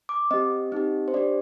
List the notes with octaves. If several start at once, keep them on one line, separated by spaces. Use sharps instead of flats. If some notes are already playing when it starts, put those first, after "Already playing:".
D6
C4 G4 D#5
C4 D#4 G4
C5
D4 G4 D5